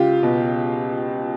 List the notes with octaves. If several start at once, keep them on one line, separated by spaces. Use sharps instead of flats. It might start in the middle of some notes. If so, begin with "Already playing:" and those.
Already playing: C#2 F4 G4
B2